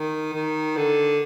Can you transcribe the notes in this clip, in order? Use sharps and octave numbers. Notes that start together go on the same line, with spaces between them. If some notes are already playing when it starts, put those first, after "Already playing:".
Already playing: D#3
D#3
D3